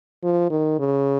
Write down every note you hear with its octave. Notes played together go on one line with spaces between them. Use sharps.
F3
D#3
C#3